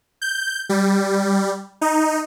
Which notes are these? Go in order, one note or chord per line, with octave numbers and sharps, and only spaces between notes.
G6
G3
D#4